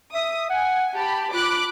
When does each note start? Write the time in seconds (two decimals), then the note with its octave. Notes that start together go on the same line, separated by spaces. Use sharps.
0.14 E5 D#6
0.50 F#5 G#5
0.96 G4 A5 B5
1.34 F4 B5 D6 F#6